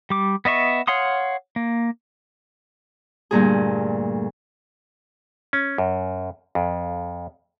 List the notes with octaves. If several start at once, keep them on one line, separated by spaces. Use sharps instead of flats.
G3 D6
B3 D#5 E5 C#6
C#5 F5 F#5 C6 D#6
A#3
D2 G2 A#2 G#4
C#4
F#2
F2